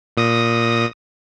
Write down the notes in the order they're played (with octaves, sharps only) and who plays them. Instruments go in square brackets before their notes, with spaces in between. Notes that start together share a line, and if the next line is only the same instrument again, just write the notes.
[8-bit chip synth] A#2 D#6 A#6